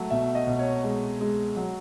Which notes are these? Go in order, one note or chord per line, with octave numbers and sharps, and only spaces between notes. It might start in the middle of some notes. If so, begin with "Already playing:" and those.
Already playing: F#3 A3
B2 E5
D#5
B2
C#5
G#3
G#3
F#3